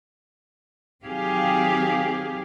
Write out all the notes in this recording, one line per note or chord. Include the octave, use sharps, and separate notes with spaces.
D#3 F#3 C4 G4 G#4 F5